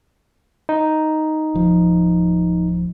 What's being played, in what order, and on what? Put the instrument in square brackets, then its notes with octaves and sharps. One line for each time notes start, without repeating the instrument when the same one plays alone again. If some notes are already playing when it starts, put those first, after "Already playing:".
[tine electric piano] D#4
[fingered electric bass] D1 F3